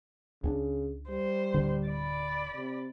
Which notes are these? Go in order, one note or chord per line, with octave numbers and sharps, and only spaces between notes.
C#2 C#3 C4 D4
G3 C5
D1 D3
D5 B5
C3